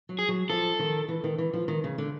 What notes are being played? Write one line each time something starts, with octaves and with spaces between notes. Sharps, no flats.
F#3
G#4
F#3
F3 A4
D#3
E3
D#3
E3
F3
D#3
C#3
D3